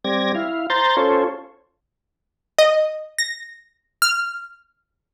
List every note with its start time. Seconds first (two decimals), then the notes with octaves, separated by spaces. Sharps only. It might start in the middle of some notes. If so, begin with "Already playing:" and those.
0.05 G3 C4 D5 G#6 A#6
0.35 E4 F5
0.70 C5 A#5 C6 G6 A6
0.97 C#4 F4 A4 C5 C#5
2.58 D#5
3.18 A#6
4.02 F6